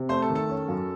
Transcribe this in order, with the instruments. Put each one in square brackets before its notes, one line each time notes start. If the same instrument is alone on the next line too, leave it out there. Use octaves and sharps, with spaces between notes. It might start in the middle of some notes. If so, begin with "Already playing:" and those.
Already playing: [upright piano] C3
[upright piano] A3 [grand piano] C5 C6
[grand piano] A4 A5
[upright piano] D#3
[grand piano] A4 A5
[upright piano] C#4
F#2